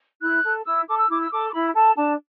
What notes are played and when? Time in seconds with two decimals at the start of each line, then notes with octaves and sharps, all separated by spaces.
0.22 E4 F#6
0.44 A4
0.65 E4 E6
0.88 A4 D6
0.98 E6
1.09 E4 D6
1.21 E6
1.32 A4 D6
1.49 D6
1.53 E4 B5
1.75 A4 A5
1.97 D4 A5